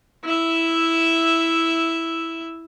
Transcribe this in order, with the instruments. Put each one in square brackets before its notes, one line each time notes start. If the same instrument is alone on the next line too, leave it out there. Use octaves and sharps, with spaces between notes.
[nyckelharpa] E4 E5